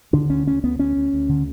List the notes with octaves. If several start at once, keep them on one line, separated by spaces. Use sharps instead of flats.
D3 D4
D2 C#4
D2 C#4
D2 B3
D2 C#4
D2
D2
D3